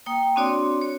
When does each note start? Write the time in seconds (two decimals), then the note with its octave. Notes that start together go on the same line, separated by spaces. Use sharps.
0.06 A#3 G5 D#6
0.36 C4 D4 F#4 C#5 D5 C6
0.82 C#5